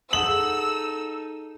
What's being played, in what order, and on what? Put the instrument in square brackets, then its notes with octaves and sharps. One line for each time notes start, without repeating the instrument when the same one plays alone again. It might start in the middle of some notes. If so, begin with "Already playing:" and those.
[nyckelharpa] D#4 A4 [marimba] G#4 F#5 D#6 [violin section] E6 [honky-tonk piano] F#7